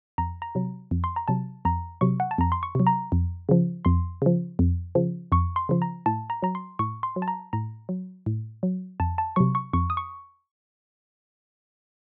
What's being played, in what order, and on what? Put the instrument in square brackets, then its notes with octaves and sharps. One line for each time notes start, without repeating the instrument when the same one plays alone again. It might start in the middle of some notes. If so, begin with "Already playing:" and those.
[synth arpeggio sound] F2 A#5
A#5
C3 F#3
F2
C6
A#5
C3 F#3 A5
F2 A#5
C3 F#3 C#6
F#5
A5
F2 A#5
C6
C#6
C3 F#3
A#5
F2
C#3 F3
F2 C6
C#3 F3
F2
C#3 F3
F2 C#6
C6
C#3 F3
A#5
A2 A5
A#5
F#3 A#5
C6
A2 C#6
C6
F#3
A5
A#5
A2 A#5
F#3
A2
F#3
F2 A5
A5
C3 F#3 C#6
C#6
F2 C#6
D#6
C#6